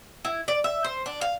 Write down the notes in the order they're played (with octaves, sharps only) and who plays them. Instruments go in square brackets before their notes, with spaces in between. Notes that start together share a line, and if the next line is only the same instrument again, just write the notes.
[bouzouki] E4
D5
E5
C5
D4
F5